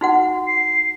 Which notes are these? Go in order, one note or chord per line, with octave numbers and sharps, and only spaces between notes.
D#4 F#4 F#5
C7